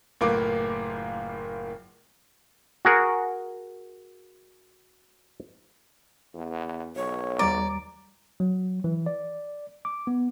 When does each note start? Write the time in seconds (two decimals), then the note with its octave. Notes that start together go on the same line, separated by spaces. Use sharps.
0.21 F#1 A2 A#3 F4 B4 D6
2.85 F#4 G#4 A#4
6.35 E2
6.96 B1 C#5
7.39 D#2 G3 D5 A#5
8.40 F#3
8.84 E3
9.06 D5
9.85 D6
10.07 B3